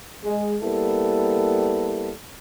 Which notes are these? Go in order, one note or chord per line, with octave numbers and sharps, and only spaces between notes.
G#3
G3 A#3 B3 E4 A4